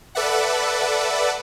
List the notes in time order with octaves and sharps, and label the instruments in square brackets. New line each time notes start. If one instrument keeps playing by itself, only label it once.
[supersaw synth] A4 B4 D5 E5 F#5